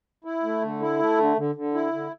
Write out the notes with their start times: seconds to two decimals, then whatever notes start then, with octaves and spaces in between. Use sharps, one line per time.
0.24 E4
0.43 A3
0.62 D3
0.80 E4
0.99 A3
1.18 D3
1.37 D3
1.55 D3
1.74 E4
1.93 D3